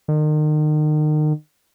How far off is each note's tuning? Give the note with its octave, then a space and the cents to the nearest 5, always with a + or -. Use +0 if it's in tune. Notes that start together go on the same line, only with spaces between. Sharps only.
D#3 -35